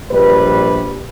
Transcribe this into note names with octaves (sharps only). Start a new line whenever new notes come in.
A#1 G3 B4